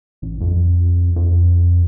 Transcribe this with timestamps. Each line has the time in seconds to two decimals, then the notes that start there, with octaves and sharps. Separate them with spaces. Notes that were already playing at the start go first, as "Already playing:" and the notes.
0.22 A1
0.41 F2
1.16 F2